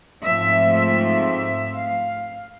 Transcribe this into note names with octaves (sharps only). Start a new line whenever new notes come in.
G#2 F3 A3 C4 E5
E5
E5
F5